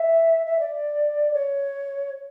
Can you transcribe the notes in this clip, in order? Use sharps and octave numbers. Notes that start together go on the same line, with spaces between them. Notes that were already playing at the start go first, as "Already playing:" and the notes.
Already playing: E5
E5
D5
C#5